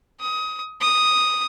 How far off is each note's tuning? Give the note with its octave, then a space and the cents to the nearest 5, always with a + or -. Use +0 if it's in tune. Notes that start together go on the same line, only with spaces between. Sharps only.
D#6 +20
D#6 +0